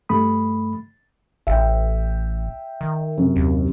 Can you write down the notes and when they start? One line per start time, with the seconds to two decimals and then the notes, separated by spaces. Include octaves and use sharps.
0.09 G2 A3 B5 D#6
1.47 A1 E5 G5
2.81 D#3
3.18 F#2 C3
3.36 D#2